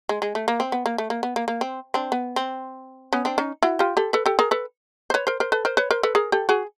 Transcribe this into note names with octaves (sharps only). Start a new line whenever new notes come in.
G#3
G#3
A3
A#3
C4
B3
A#3
A3
A#3
B3
A#3
A#3
C4
C4 D4
B3
C4
B3 C#4
C4 D4
C#4 D#4
E4 F#4
F4 G4
G4 A4
A4 B4
G4 A4
G#4 A#4
A4 B4
C5
B4 C#5
A#4 C5
A#4 C5
A4 B4
A#4 C5
B4 C#5
A#4 C5
A4 B4
G#4 A#4
G4 A4
F#4 G#4